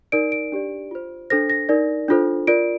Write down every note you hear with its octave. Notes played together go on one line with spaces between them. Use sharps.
D#4 A#4 D5 D7
D7
D4 G4 D5
F4 C5
D4 A4 C5 A#6
A#6
D#4 A#4 D5
D4 F4 A4 C5
F4 A#4 D5 D7